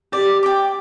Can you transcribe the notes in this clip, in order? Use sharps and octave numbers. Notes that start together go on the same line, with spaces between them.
G4 D5
G5 D6